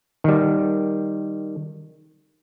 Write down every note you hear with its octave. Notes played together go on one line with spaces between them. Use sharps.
D#3 G3